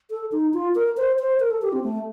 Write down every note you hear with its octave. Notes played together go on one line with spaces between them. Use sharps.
A4
D#4
F4
A#4
C5
C5
A#4
A4
G4
C4
A3